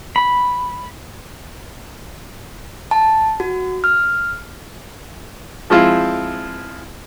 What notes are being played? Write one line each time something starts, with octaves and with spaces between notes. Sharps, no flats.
B5
A5
F#4
F6
F3 G#3 C4 E4 F4